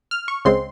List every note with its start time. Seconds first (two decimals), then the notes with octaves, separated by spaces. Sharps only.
0.11 F6
0.28 C#6
0.45 C#2 C#3 G#3 C4 C6